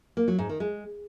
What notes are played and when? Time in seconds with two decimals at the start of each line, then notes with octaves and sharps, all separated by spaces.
0.17 A#3
0.28 F#3
0.39 G#2
0.49 D#3
0.60 G#3